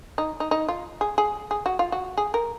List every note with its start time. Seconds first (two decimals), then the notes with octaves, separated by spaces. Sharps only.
0.18 D#4
0.40 D#4
0.51 D#4
0.68 F4
1.01 G#4
1.18 G#4
1.51 G#4
1.66 F#4
1.79 F4
1.92 F#4
2.17 G#4
2.34 A#4